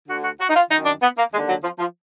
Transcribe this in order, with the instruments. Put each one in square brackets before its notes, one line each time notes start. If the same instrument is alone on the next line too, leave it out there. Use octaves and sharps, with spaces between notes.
[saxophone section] D2 D3 F#4
F#4
F#4
D#4
F4
D#3 D#4
F#2
D4
B3
A#3
D#2 G#3
D3
F#3
F3
F3